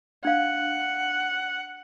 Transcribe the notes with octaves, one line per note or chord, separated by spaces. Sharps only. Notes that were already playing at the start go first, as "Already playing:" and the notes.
D4 F5 F#5